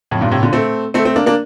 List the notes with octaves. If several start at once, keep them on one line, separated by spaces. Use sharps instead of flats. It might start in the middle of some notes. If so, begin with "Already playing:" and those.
F2 A2
G2 A#2
A2 C3
A#2 D3
A3 C4
A3 C4
A3 C4
A#3 D4
A#3 D4